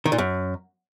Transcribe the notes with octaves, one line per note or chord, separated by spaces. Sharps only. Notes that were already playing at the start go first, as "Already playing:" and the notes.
D#3
A#2
F#2